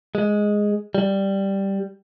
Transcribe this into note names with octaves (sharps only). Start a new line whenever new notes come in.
G#3
G3